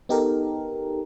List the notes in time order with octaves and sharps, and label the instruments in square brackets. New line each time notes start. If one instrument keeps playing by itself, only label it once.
[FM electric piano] B3 D#4 G4 A4 A#4